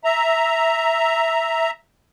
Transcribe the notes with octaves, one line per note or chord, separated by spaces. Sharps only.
E5 A#5